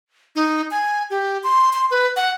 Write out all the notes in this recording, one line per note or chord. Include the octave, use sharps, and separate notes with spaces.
D#4
G#5
G4
C6
C6
B4
F#5